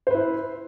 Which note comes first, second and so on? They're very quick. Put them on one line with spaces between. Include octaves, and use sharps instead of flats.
C5 B4 E4